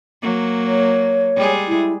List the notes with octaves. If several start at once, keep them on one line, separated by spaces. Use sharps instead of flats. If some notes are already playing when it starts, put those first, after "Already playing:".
F#3 A#3
C#5
G3 G#3 G#4
E4